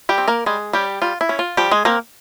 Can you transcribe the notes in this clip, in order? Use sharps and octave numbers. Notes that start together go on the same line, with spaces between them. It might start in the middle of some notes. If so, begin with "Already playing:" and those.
G3 G4
C4
A#3 A#4
G3 G#3 G#4
G3 C#4 G4
G3 F4
E4
C#4
F4
F3 G3 G4
G#3 G#4
A#3 C4 A#4